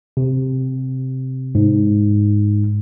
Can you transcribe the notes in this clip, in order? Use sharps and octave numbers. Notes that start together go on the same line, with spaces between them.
C3
G#2